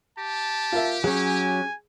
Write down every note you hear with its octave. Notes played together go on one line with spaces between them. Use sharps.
G4 A5
F4 A#4 E5
F#3 C#4 G#4 G#5